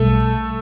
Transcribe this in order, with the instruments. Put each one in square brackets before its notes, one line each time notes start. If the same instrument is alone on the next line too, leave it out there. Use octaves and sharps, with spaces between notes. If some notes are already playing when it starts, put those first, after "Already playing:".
Already playing: [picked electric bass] B1 B2 G3 [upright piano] A3 A4